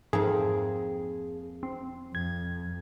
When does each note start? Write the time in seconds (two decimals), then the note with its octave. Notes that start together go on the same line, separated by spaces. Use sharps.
0.13 F2 G#2 A#3 G#4
1.63 C4
2.15 F2 G#6